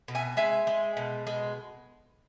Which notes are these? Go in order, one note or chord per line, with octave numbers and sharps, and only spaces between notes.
B2
E5 G#5
G#3 E5 G#5
G#3
B2
G#3